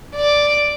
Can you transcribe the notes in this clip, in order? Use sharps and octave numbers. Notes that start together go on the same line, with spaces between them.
D5